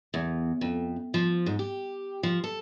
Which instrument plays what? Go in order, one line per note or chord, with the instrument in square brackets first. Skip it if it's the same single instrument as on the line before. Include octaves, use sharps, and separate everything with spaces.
[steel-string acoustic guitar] E2
F2
F3
G#2
G4
F3
A4